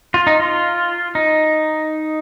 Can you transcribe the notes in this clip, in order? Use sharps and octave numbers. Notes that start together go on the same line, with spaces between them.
F4
D#4
F4
D#4